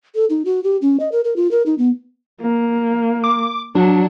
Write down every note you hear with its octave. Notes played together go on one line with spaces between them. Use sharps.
A4
D#4
F#4
G4
C#4
D#5
A#4
A#4
F4
A#4
D#4
B3
A#3
D6
F#3 D4